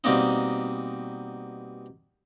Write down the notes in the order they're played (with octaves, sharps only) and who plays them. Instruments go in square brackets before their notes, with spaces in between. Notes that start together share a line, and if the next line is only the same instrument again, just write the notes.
[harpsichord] B2 G3 A#3 C4 D#4